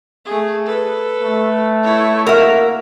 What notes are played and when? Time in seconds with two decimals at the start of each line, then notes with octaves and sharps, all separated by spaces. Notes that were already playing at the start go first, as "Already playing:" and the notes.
0.25 A3 G#4
0.65 A4 B4
1.23 A3
1.83 E4 C#5
2.27 A#3 F#4 A#4 E5